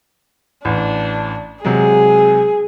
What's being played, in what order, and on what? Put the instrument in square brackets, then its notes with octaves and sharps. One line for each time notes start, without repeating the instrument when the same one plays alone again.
[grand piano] A1 [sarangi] D4
[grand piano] C3 F#3 G#3 [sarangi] G#4